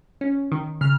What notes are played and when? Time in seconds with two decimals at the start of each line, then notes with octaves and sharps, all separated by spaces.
0.21 C#4
0.52 D#3
0.81 C#3 F6